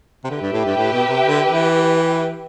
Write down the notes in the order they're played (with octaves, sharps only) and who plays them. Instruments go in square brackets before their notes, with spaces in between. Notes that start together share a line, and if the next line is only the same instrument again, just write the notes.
[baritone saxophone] C3
[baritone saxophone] D3 [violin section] G4 B4 E5 G5
[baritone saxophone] G2
A2
G2
A2
B2
C3
D3
E3